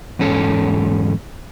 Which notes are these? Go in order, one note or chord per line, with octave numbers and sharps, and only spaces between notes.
E2 G#2 C#4 A4